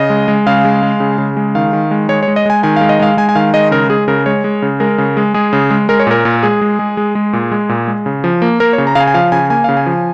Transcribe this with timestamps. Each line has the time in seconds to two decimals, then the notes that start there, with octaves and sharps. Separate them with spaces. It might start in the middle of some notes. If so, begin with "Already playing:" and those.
Already playing: C#3 D#5
0.10 G#3
0.28 G#3
0.47 C#3 F5
0.65 G#3
0.83 G#3
1.00 C#3
1.18 C#3
1.37 G#3
1.55 D#3 F5
1.73 D#3
1.91 G#3
2.09 G#3 C#5
2.23 C#5
2.28 G#3
2.36 D#5
2.46 G#3 G#5
2.63 D#3 G#5
2.76 G#3 F5
2.89 D#5
3.00 G#3 F5
3.17 G#3 G#5
3.29 G#5
3.35 D#3 F5
3.54 G#3 D#5
3.71 C#3 A#4
3.90 G#3 G#4
4.08 C#3 A#4
4.26 G#3 C#5
4.44 G#3
4.62 C#3
4.80 G#3 A#4
4.98 C#3
5.17 G#3
5.34 G#3 G#4
5.53 C#3
5.71 G#3
5.89 G#3 A#4
5.99 C#5
6.07 A#2 A#4
6.25 A#2
6.43 G#3 G#4
6.61 G#3
6.79 G#3
6.97 G#3
7.15 G#3
7.33 A#2
7.52 G#3
7.69 A#2
7.88 G#3
8.06 C#3
8.24 F3
8.42 A#3
8.60 A#3 A#4
8.73 C#5
8.78 C#3
8.87 A#5
8.95 C#3 F5 G#5
9.07 G#5
9.14 F3 F5
9.32 C#3 G#5
9.50 A#3 G#5
9.64 C#3 F5
9.77 G#5
9.86 F3